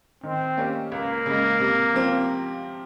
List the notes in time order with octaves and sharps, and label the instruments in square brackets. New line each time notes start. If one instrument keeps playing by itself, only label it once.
[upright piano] D#3 [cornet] C4
[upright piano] A#3 C#4 G4
[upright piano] C#2 [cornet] A#3
[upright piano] C#3 G#3
C3
F3 C4 F4